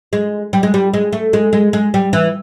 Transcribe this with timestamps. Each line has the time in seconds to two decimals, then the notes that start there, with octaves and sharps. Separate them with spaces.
0.13 G#3
0.53 G3
0.63 G#3
0.74 G3
0.93 G#3
1.13 A3
1.33 G#3
1.53 G#3
1.73 G#3
1.94 G3
2.13 E3